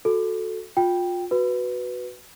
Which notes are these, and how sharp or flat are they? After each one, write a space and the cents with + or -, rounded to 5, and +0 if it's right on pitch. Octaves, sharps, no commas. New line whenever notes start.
F#4 -10 A4 +0
F4 +25 G5 +0
F#4 +0 B4 +0